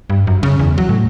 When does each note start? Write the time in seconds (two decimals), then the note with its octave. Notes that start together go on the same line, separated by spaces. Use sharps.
0.10 G2
0.27 F#2
0.43 C#3
0.59 E2
0.78 F#3
0.89 A2